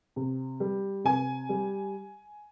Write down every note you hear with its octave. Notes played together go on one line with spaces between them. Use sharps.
C3
G3
C3 G#5
G3